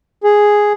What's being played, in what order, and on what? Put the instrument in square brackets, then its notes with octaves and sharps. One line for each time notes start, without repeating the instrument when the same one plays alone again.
[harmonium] G#4